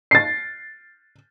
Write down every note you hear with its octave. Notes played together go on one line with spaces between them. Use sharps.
A6 C7